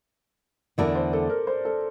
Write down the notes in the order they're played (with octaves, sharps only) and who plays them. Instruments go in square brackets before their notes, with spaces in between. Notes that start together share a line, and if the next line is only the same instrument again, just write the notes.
[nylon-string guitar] E2 D3 A3 E4 A#4 [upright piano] D5
[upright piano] C5
A4
A#4
C5
A4